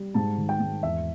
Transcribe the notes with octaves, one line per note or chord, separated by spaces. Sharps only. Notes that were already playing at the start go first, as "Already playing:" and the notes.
Already playing: G3
G#2 A5
D#3
G5
G#2
E2 E5